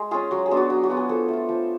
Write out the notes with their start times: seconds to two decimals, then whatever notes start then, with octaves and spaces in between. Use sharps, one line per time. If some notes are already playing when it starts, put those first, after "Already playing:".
Already playing: G#3
0.11 C#4 F4 G#4
0.31 F#3 F#4
0.46 G#4
0.51 B3 D4 F4
0.57 F#4
0.70 F#3 F#4
0.83 F#4
0.90 B3 D4 F4
0.97 G#4
1.09 F3 A4
1.28 A3 F4
1.49 F3